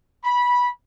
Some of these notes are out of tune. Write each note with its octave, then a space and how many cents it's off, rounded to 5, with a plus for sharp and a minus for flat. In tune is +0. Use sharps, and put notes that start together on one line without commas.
B5 -15